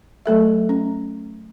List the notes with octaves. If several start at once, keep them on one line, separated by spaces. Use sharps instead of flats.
F#3 A3 A4 E5
C#4